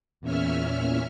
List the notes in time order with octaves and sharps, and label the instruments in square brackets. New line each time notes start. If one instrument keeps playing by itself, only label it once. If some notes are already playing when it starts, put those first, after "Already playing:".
[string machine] E2 A#2 C#4 E5 F6